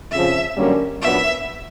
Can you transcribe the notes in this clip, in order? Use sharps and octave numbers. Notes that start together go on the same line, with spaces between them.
F2 C#3 F3 E5
F#2 D3 G3 A#3 C#4
A#2 F#3 B3 D4 E5